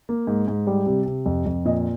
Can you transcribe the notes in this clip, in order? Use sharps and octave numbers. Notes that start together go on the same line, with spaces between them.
A#3
G#2
G#2
G3
C3
C3
F2
F2
A#2 D#5